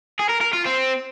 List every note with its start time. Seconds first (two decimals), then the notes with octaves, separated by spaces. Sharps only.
0.19 G#4
0.29 A#4
0.41 A#4
0.53 F4
0.66 C4